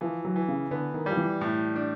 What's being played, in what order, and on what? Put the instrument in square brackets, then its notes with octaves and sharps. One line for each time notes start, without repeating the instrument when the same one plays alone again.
[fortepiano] E3 [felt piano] F3
[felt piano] F#3
[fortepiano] E3
[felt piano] C#3
[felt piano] D3 [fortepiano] B3
[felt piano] D#3
[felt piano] F3 [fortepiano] G3
[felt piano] E3
[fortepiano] A2
D4